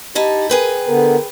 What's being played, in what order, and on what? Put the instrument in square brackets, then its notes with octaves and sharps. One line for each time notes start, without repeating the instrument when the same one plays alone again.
[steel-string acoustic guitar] D#4 E4 A5 [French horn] G4
[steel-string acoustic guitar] G#4 B4 G5 [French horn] A#4
[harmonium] D3 B3 [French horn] A#4